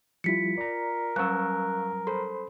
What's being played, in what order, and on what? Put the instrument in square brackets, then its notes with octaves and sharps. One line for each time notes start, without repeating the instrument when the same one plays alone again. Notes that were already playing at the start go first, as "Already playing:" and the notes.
[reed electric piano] F3 G3 E4 [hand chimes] F4 B6 C#7
[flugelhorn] A#4 [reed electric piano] D5 A#5
[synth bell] F#3 G3 C#4 [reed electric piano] F5 C#6 E6 [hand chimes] F#6
[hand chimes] A4 [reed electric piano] C5 B5 C6